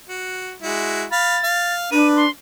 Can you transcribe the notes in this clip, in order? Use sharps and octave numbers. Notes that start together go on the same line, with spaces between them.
F#4
G#3 E4 F#4
F5 B5 A6
F5
D4 B4 D#7
C6